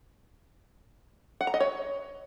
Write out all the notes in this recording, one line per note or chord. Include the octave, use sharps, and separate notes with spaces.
F#5
A#5
D#5
C#5